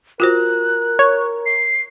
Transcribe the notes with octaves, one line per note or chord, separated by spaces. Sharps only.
F4 F#4 A#4 C5 F#6
C#5
C7